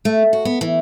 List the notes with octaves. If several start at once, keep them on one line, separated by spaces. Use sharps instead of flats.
A3
F#4
B3
E3